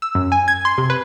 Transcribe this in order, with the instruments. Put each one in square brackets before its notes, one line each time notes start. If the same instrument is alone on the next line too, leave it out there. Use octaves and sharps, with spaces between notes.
[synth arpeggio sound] E6
F#2
G#5
G#6
C6
C3
B4